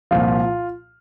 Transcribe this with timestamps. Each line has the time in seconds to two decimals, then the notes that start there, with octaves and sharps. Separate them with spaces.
0.11 C2 A#2 F3 F4